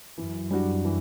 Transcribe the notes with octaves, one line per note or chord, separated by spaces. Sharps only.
F#2 E3
G3 D4 F#4
E3